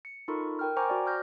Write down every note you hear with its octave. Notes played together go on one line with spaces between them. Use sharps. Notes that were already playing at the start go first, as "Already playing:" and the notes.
C#7
D#4 F4 A4 A#4 B5 C#6
A#4 G5 F6
C5 G5 G#5 A#5 C#6 D6
F#4 C5 D5
D6 F6 G6 A#6